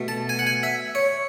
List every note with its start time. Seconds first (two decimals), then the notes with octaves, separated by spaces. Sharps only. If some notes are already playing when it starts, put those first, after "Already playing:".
Already playing: B2 A3
0.08 A5
0.29 G#5
0.39 F#5
0.47 G#5
0.63 E5
0.95 C#5